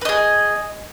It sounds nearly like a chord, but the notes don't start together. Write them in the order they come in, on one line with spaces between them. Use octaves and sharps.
B4 D#5 G#4